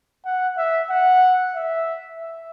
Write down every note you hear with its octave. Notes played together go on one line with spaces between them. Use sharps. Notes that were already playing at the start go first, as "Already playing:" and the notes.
F#5
E5
F#5
E5
E5